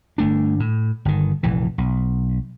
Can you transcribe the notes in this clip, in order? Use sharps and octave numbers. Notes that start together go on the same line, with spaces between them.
G1 A3 D4
A2
G1 D#3
F1 A#1 E3
B1